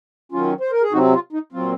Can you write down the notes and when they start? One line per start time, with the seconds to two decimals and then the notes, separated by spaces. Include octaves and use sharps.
0.32 D#3 F#3 C#4 F4
0.61 C5
0.72 A#4
0.82 G#4
0.92 C3 F#3 C4 D#4 F#4
1.13 F4
1.33 D#4
1.52 A#2 F#3 C4 F4